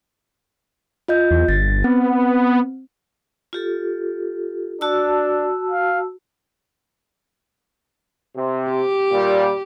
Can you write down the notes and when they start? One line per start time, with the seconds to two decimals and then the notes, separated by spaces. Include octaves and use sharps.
1.08 F4 D#5 G6
1.31 E2
1.49 G1 A6
1.84 B3 C4
3.53 F4 G4 A4
4.81 D4 F#4 A5 E6
5.70 F5
8.36 C3
8.71 G4
9.11 A#2 G3